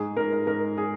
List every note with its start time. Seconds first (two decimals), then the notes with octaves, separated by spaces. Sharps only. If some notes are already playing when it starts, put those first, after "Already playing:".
Already playing: G#2 G#4
0.17 G#2 A#4
0.33 A#4
0.47 G#2 A#4
0.77 G#4